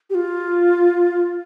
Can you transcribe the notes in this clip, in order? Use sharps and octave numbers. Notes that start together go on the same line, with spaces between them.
G4
F4